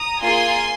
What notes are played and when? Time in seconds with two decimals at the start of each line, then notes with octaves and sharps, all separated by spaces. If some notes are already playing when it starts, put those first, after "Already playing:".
Already playing: A#5 D#6
0.22 A#3 F4 G#4 G#5 C6